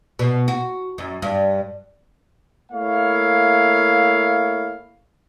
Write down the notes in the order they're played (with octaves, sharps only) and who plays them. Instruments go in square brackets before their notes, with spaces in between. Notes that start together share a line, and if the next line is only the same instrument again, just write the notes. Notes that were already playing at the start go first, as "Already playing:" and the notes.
[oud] B2
F#4
F#2
G2
[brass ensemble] A3 A#3 E4 C#5 F5